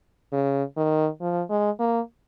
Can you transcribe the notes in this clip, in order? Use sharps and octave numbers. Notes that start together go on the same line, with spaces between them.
C#3
D#3
F3
G#3
A#3